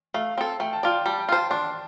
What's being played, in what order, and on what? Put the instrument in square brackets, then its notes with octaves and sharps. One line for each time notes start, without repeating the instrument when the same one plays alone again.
[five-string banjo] A3 [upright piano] F5
[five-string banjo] C4 A4
[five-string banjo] A3 [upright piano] G5
[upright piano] A5
[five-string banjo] F4 D5 [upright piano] G5
[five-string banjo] G3 [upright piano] A5
[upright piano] G5
[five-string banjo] F4 C5 [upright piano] A5
[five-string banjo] D4 [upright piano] C6